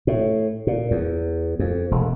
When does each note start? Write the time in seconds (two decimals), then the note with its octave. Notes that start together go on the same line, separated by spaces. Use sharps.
0.07 A2
0.67 A#2
0.91 E2
1.59 F2
1.91 E1